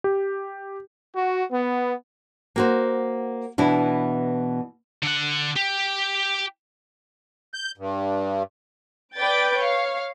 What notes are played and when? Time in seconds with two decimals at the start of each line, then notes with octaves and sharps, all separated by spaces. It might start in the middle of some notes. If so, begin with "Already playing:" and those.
0.04 G4
1.14 F#4
1.51 B3
2.56 A#3 F#4 C5
3.58 B2 E3 D4 E4
5.03 D3 F#5
5.56 G4
7.54 G6
7.77 G2
9.15 B4 D5 G5 G6 A6 D7
9.57 C#5 F5